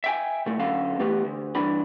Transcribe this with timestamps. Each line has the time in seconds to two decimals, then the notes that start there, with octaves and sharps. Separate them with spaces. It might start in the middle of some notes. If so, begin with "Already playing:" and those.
0.04 E5 G5 G#5
0.46 A#2 A3
0.59 D3 F#3 C#4 A4 F5
0.99 E3 A3 B3 G4
1.24 D2
1.55 G2 E3 D4 B5